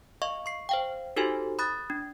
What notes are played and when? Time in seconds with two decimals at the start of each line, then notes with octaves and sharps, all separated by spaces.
0.22 D#5 F5 C#6
0.46 C#6 C7
0.69 C5 F5 G5
1.16 D#4 F#4 G4 A4 C5 G#5
1.59 B5 D#6 F#6 A6
1.90 D4